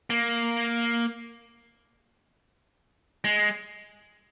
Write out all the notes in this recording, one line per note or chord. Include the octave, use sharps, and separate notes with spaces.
A#3
G#3